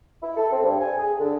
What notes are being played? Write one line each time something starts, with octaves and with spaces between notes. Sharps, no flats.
E4
A4
C4
G2
G#5
G#4
D3